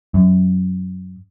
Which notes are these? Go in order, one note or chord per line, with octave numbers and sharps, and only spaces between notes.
F#2